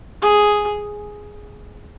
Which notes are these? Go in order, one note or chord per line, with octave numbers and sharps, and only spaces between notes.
G#4